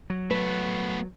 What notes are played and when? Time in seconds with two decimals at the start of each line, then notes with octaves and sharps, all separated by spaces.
0.10 F#3
0.31 A3 B3 B4